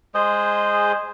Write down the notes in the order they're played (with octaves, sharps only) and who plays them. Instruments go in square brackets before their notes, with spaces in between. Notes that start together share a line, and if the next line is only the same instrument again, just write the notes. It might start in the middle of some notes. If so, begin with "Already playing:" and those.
[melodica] G#3 G#4 C5 D#5